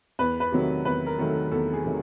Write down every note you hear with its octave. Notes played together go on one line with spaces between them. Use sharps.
E2 B4
B4
C3 D#3 F#3 A3
E2 B4
A#4
C3 D#3 F#3 A3
A4
E2 A4
G#4
C3 D#3 F#3 A3